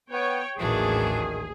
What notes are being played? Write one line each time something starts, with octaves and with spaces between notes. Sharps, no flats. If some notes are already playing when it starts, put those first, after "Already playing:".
B3 C#5 G5
A1 D#2 A2 D#3 E3 F#3 D4 G#4